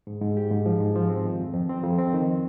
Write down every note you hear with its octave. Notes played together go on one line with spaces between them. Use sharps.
G#2
G#2
G4
G#2
F3
G#2
F3
C4
D#3
F2
F2
C4
F2
C4
D#3